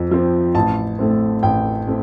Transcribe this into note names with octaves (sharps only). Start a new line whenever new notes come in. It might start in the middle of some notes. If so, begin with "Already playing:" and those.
Already playing: F2 F3
F3 C4
A1 A5
A2 A3 C4
A1 G5
A2 A3 C4